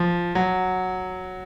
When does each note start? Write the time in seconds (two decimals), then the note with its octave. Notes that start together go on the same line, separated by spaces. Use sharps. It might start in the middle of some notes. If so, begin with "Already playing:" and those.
Already playing: F3
0.35 F#3